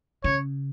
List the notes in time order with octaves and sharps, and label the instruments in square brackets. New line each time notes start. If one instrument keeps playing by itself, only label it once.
[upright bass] C#3 [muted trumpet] C#5